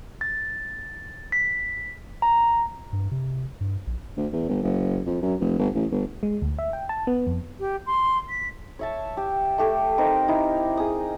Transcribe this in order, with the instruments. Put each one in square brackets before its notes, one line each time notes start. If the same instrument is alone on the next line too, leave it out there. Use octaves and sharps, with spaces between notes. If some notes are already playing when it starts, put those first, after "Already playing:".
[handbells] A6
B6
A#5
[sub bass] G2
C3
G2
A#1
[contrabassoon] D2
E2
G1
F#1
F2
F#2
F1
G1
A1
G1
[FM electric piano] G#3
D2
E5
G5
A5
B3
F2
[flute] G4
C6
B6
[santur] C#5 E5 A5
G4
A3 G4 A4
C4 D#4 G4 A#4
D#4 E4
G#4 D#6